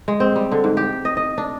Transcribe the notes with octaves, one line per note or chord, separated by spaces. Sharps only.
G#3
C4
G3
D3
G#2
G4
D#5
D#5
D4